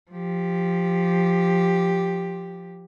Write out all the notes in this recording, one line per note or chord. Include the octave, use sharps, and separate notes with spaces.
F3 G4